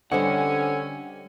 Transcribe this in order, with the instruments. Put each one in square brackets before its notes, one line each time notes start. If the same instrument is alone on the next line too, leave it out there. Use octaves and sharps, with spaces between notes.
[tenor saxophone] D3 [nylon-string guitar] G3 C5 D#5 [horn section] C#4 G#5 [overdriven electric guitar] F#5